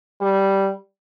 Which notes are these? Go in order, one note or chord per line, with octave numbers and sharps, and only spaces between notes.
G3